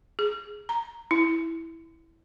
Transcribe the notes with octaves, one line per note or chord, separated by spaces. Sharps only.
G#4
A#5
E4